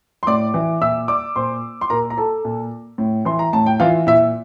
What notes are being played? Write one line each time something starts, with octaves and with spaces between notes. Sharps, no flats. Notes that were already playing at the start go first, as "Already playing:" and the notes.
C6
A2 D5 D6
E3
A#2 E5 E6
D5 D6
A#2 C5 C6
C6
A#2 A#4 A#5
A#5
A4 A5
A#2
A2
E3 C6
A#5
A2 A5
G5
E3 F4 F5
A#2 E4 E5